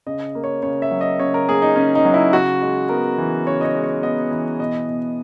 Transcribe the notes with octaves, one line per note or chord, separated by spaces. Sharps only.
C#3 D#5
A#3
C#5
C#3 C#5
E5
F#3
D#5
C#3 C#5
A#4
A#3 G#4
D#4
C#3 C#4
D#4
F#3
E4
C#3 F#4
G#3
B3 A#4
E3
C#3 C#5
D#5
C#5
G#3
C#5
B3 D#5
E3
B2 D#5
B2